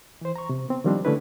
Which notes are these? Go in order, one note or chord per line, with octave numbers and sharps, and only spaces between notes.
E3 C5
A#5 C#6
C3
B3 C4
D#3 F3 G3 C4 D4
D3 A3 C#4 D4 E4 B4